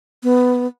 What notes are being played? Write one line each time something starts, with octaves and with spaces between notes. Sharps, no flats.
B3